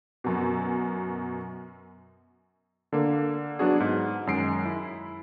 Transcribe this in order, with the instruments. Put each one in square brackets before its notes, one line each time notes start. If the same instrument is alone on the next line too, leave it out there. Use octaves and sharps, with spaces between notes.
[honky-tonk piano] F#2 B2
[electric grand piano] D3 A#3
F#3 B3 D4 F#4 G#4
G#2
F#2 D#3 G#3 C7 D7
E4